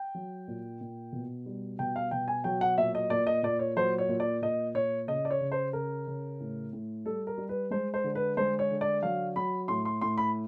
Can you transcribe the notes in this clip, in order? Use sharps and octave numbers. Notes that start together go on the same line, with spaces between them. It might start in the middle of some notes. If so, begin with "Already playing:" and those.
Already playing: G5
F#3
A#2
A#2
B2
G3
B2 G5
F5
B2 G5
G#5
F#3 G5
F#5
A#2 E5
D#5
A#2 D5
D#5
A#2 D5
C#5
F#3 C5
C#5
A#2
D5
A#2 D#5
A#2 C#5
C#3 D#5
D5
C#5
C#3
C5
C#3 A#4
C#3
A2
A2
G3 A4
A#4
G3
B4
G#3 C5
C5
D3
B4
G#3 C5
C#5
D3
D5
F#3 F5
F#3 B5
A2 C6
C6
A2 C6
B5